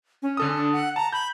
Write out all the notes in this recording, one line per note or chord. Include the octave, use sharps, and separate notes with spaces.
C#4
D3 A4 D#6
D4
F#5
A5 A#5
B5 G6